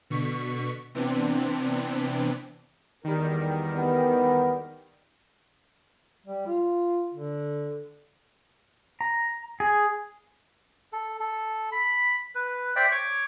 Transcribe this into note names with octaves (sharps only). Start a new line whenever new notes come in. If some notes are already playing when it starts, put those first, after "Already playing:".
B2 D3 C#6 B6
C3 E3 B3 C4 D4
E2 D#3 G3 A#4
B3
G3
F4
D3
A#5
G#4
A4
A4
B5
B4
C5 D5 E5 G5
C#5 C#6 D6